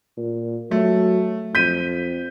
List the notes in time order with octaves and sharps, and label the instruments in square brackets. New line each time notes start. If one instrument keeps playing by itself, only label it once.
[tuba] A#2
[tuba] F#3 [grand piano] A3
[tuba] F2 [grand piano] G6 B6 D#7